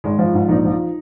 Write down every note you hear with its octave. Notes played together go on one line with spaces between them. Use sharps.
G#1 G#3
F3
G#2
A#1 D#4
F3